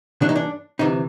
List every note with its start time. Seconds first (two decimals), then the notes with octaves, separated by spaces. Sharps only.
0.21 G2 E3 A3 D4
0.29 D#4
0.36 D4
0.79 D2 C3 E3 D#4